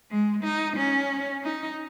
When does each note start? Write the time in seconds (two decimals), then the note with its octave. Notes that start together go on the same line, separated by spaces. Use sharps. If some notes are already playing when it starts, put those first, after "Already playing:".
0.11 G#3
0.44 D#4
0.77 C#4
1.44 D#4